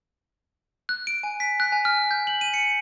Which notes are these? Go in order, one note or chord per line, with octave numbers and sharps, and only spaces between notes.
F#6
D7
G#5
B6
F#6
G#5
F6
G6
F#7
D#7
C#7